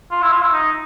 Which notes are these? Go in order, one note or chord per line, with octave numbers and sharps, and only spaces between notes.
F4
E4
F4
E4
D#4